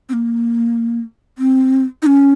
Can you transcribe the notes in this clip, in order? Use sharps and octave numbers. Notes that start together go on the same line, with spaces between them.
C4
A#3
C4
D#4
C#4